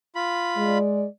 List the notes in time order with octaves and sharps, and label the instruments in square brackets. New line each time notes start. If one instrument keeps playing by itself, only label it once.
[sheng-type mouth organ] F4 B5
[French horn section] G#3 D5